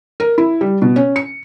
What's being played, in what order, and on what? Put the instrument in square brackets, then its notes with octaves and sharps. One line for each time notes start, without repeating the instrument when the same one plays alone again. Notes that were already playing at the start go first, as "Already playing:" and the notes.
[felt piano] A#4
E4
G3
B2
C#4
C#7